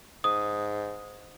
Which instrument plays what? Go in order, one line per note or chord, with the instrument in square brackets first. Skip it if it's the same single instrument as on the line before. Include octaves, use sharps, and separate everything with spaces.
[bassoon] G#2 [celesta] D#6